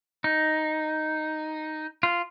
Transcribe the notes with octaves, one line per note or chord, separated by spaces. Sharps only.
D#4
F4